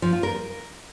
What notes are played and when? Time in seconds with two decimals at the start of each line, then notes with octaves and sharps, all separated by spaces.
0.02 F3
0.13 F4
0.23 A#4